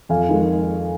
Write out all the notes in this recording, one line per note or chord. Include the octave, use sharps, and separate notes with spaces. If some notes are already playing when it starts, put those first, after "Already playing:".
F2 F5 G#5
D#3 G#3